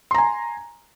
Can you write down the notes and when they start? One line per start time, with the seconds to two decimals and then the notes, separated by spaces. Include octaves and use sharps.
0.11 C6
0.15 A#5
0.18 G#5